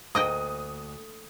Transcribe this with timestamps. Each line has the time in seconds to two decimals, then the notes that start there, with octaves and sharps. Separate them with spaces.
0.15 D2 A#3 D#5 G5 D#6